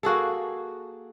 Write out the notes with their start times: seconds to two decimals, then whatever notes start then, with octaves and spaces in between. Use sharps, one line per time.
0.03 A#3 F#4 G#4 A4